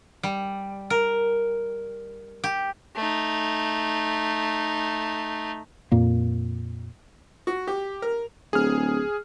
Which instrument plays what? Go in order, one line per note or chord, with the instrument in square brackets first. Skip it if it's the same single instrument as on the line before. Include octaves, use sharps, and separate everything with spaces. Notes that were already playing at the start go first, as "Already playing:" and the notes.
[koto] G3
A#4
G4
[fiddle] A3 D#4
[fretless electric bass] F2 A#2 A#3
[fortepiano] F#4
G4
A#4
[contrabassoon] D1 [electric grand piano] G#4 F6